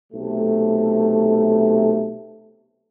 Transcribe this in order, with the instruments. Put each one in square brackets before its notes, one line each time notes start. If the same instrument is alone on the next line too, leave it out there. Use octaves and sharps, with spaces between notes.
[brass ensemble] B1 C3 A3